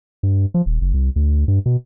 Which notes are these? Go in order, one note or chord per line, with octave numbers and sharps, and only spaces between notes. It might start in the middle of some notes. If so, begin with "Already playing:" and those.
G2
F3
D#1
F#1
C2
D2
G2
B2